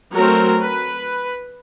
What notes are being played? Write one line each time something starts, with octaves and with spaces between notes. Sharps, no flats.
F#3 A3 C4 A#4
B4